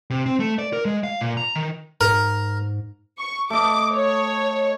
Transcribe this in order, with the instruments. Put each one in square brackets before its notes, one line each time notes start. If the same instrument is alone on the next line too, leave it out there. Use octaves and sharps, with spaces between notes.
[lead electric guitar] C3
C4
A3
D5
A#4
G#3
F5
A#2
A#5
D#3
[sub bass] G#2 [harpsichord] A#4
[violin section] C#6
[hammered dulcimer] A3 D#5 [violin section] D6
[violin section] C#5